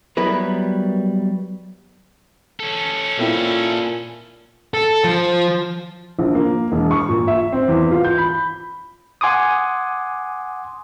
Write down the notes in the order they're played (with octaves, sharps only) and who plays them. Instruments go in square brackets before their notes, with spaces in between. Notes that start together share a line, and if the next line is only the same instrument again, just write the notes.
[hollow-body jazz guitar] F#3 G3 B3 E4 A#4 B4
[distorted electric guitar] C#4 A4
[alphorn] A#2 [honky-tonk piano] A#3 C4 E4
[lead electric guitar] A4
F3
[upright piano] A#1
A#3
E1
C#6
A#2
E5
C4
E2
F4
G6
B5
[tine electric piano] F#5 G#5 C6 D6 D#6